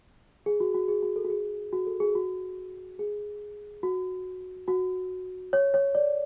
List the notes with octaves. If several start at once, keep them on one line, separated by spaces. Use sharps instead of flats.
G#4
F#4
F#4
G#4
F#4
A4
F#4
G#4
F#4
A4
G#4
F#4
G#4
F#4
F#4
C#5
C#5
D5